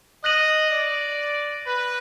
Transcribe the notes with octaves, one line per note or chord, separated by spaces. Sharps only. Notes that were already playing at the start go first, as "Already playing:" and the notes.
D#5 F#6 A#6 D#7 F#7
D5
B4